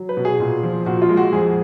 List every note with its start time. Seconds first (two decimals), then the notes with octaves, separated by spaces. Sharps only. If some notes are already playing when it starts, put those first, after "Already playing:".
Already playing: F#3
0.09 B4
0.17 B2
0.25 G#4
0.40 A#2
0.63 F3
0.86 A#2 F#4
1.02 F4
1.09 G#3
1.17 F#4
1.32 F2 G#4